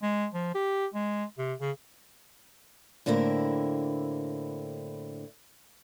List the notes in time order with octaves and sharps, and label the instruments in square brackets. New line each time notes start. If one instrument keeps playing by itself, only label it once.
[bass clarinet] G#3
F3
G4
G#3
C3
C#3
[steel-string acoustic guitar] A2 D3 A#3 C4 E4